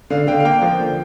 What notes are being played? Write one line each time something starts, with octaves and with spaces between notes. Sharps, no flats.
D3 F5
D3 G5
F5
A#3 G5
F3
D3